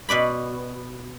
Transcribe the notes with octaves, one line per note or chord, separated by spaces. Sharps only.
B2 B4 D5 B5